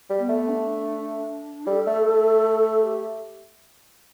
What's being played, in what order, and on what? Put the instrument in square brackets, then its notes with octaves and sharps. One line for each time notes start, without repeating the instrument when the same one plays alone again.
[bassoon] G3
[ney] B3
[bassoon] A3
[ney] D4
[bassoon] G3 [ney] A4
[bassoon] A3
A3
[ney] G4